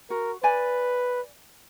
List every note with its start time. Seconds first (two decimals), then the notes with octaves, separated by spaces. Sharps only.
0.10 F#4 A#4
0.43 B4 D5 G#5